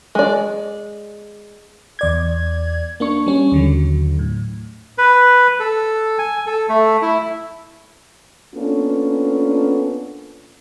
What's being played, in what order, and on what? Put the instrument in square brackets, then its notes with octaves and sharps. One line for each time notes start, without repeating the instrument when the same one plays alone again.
[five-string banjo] G#3 D5
[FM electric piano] E2 D5 G#6
A#3 D4 C#6
G3 C#4
D#2 D3 F#3
A2
[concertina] B4
A4
G#5
A4
A3
E4
[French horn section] A#3 B3 C#4 D4 F4 A4